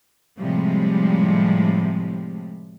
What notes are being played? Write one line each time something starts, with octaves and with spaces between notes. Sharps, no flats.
A2 C3 F3 G3 G#3